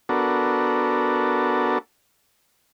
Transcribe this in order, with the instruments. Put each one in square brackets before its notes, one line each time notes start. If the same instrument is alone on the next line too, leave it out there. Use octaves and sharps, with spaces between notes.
[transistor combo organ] B3 D4 F#4 A4 A#4